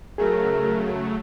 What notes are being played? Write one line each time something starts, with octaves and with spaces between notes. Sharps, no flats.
C#3 F#3 A3 G#4 A#4